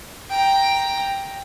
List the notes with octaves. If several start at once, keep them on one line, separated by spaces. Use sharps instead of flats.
G5 A#5